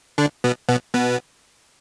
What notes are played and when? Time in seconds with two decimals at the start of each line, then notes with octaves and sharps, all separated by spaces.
0.18 D3 D4
0.44 B2 B3
0.69 B2 B3
0.94 B2 B3